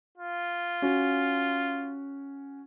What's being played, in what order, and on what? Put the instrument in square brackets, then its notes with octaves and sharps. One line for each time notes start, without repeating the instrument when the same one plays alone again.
[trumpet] F4
[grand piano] C#4 F#4